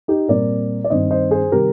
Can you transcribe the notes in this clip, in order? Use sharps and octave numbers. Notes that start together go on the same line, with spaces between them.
D#4 G4
A#2 G3 C4 A#4 D5
D5
G2 D#3 G3 C4 C5 D#5
C5 D#5
G#4 C5
C3 D#3 G3 C4 G4 A#4